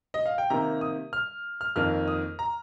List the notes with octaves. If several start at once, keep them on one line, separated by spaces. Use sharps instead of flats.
D#5
F5
G5
C3 D#3 A#3 A#5
D#6
F6
F6
F2 D#3 A#3 F6
D#6
A#5